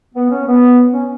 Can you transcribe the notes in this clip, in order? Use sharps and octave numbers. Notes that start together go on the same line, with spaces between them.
B3
C#4
B3
C#4